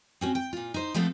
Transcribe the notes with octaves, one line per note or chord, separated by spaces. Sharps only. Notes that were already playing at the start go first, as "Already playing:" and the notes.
C4 C#4 F#4
G5
A#2 F4
D#4 C5
F3 A3 B3 C4 A4